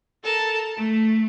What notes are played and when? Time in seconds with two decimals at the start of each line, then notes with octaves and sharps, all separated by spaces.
0.23 A4 A#4 A5
0.76 A3